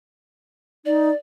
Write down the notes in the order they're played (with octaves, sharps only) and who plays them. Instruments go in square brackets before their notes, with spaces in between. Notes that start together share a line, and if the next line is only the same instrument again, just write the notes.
[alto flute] D#4 [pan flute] D5